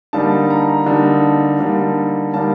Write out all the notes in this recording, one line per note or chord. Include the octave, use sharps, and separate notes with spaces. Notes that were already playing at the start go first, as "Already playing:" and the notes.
D3 G3 A#3 D#4 A5
A#5
D3 G3 A#3 D#4 A5
D3 G3 A#3 D#4
D3 G3 A#3 D#4 A5